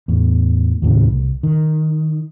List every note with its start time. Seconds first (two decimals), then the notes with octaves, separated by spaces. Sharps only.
0.08 E2 A2
0.82 D#2 A2 C#3
1.06 C2
1.43 D#3